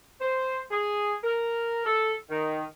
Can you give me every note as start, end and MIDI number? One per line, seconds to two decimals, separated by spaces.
0.20 0.60 72
0.71 1.14 68
1.24 1.82 70
1.85 2.12 69
2.30 2.63 51